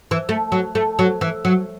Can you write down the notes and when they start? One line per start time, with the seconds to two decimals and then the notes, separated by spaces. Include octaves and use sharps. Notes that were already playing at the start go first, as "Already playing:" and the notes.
0.11 E3
0.29 A3
0.52 F#3
0.75 A3
0.99 F#3
1.21 E3
1.45 F#3